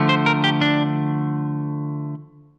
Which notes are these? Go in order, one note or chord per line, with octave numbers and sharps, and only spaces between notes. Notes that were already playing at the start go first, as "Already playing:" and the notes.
Already playing: D3 F3 A3
C5
A#4
G4
D4